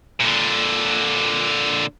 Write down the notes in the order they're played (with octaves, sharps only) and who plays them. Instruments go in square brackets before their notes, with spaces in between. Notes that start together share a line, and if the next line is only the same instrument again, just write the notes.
[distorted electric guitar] A#2 D3